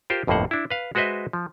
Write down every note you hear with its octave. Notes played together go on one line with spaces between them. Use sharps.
F4 G4 A#4 C5
G1 F2 A2 A#3 C5 F#5
D4 E4
B4 F5
G#3 F#4 B4 C5 D#5 E5
F3